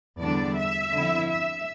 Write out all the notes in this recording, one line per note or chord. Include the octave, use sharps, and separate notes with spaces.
E2 D3 G3 D4 D5
E5
D3 F3 C4 E4
E5